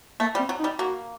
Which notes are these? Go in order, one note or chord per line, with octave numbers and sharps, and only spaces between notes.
A3 A#3
G3
C4
F#3
D#4
G3
A#3 F#4